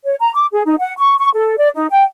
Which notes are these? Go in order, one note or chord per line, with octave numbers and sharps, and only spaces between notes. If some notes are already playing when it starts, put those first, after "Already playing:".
C#5
A#5
D6
G#4
D#4
F#5
C#6
C#6
A4
D5
D#4
G5